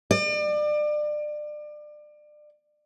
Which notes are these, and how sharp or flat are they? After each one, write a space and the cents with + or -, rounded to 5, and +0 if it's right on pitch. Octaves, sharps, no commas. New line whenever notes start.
D5 +30